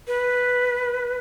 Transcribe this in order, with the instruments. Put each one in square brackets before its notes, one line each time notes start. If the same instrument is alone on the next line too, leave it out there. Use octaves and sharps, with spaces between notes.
[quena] B4